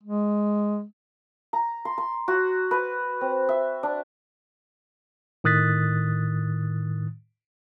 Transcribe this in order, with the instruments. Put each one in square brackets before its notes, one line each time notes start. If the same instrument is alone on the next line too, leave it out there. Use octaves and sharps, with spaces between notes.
[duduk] G#3
[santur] A#5
C6
C6
F#4
B4
C4
E5
D4
[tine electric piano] A2 D#3 D#6 F#6 A6 B6